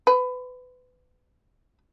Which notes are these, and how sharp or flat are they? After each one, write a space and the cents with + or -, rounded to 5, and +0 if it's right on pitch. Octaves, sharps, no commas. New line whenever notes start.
B4 +25